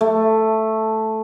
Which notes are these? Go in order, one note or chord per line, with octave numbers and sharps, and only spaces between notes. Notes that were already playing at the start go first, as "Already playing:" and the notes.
A3